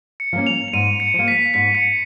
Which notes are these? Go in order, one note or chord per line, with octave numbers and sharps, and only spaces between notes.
C#7
F3 A#3 C#4
F7
F7
G#2 D#7
C#7
F3 A#3
B6
G#2 B6
C#7